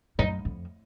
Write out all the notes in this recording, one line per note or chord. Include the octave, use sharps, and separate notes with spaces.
F#2 D#4
F2